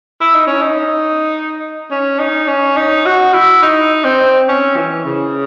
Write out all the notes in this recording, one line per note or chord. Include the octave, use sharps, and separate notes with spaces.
E4
D#4
C#4
D#4
C#4
D#4
C#4
D#4
F#4
E4
D#4
C4
C#4
E3
C#3